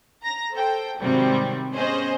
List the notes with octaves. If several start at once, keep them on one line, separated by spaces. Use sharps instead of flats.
A#5 A#6
A4 C5 G5
G#2 C3 D#3 F#3 G3 C4
B3 C#4 G#4 C5 D#5